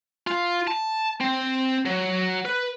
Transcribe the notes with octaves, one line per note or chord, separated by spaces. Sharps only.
F4
A5
C4
F#3
B4